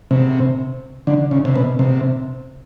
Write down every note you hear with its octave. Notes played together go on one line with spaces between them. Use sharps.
C3
D3
C#3
C3
B2
C3